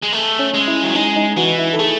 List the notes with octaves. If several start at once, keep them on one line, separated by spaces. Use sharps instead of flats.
G#3
A3
C#4
G#3
E4
F#3
G#3 D#4
D#4
E3 F#4
E4
A4
A3 G#4